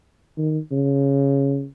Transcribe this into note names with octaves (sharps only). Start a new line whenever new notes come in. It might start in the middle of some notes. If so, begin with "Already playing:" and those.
D#3
C#3